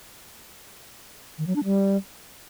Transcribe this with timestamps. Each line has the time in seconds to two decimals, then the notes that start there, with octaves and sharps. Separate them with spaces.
1.38 D#3
1.47 F#3
1.56 D4
1.65 G3